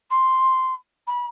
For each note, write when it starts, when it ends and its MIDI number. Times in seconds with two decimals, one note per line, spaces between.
0.10 0.74 84
1.07 1.26 83